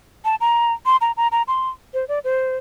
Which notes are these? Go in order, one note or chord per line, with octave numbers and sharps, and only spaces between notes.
A5
A#5
C6
A#5
A#5
A#5
C6
C5
D5
C5